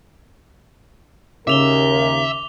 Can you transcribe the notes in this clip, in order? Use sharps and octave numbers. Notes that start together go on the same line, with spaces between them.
D#2 C#3 A#4 E5 D6 F7 G7